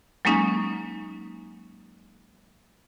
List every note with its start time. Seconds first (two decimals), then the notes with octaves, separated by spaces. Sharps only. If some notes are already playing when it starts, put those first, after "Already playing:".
0.25 F#3 G#3 A#3 C#4 D#4